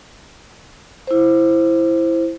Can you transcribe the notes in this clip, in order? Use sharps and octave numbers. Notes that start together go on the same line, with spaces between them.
E4 C5